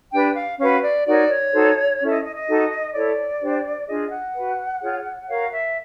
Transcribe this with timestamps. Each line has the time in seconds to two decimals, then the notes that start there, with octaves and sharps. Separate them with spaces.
0.12 D4 G4 B4 G5
0.35 F5
0.59 C#4 F#4 B4 F5
0.82 D5
1.07 D#4 F#4 A#4 C#5 D5
1.29 C#5
1.53 D#4 F#4 A4 C5
2.01 C#4 E4 A4
2.11 D#5
2.24 D#5
2.36 D#5
2.47 D#4 F#4 A4
2.93 E4 A4 C#5 D5
3.41 D4 G4 C5
3.87 D4 F4 G#4 D#5
4.11 F#5
4.34 F#4 B4
4.81 F4 G#4 C#5
5.28 F#4 A#4 C#5 F5
5.52 E5